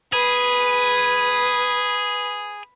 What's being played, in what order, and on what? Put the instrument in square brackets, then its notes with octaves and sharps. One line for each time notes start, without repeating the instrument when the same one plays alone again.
[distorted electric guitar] G#4 [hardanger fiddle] B4